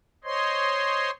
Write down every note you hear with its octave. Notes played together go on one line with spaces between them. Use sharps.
C5 C#5 D#5 C6